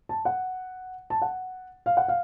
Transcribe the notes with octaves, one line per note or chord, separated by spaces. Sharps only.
A5
F#5
A5
F#5
F5
F#5
F5